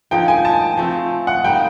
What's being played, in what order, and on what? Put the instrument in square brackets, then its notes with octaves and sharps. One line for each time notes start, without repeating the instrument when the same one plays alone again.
[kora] D3 F3 A#3 D#4 [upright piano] G5
[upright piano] G#5
A5
[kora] F3 A3 C4
[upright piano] F#5
[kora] G3 A#3 D#4 [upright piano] G5